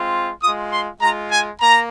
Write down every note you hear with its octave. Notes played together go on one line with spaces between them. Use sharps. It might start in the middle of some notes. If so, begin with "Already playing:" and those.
Already playing: G#3 C4 F4
G#3 F4 D#6
C6
G#3 F4 A#5
G#5
A#3 A#5